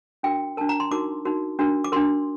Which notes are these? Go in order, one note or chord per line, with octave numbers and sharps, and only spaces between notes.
D4 F#4 A#4 G5
D4 F#4 A#4 A5
A#5
C6
D#4 F#4 A#4 D6
D#4 F#4 A#4
D4 F#4 A#4
D6
D4 F#4 A#4 C6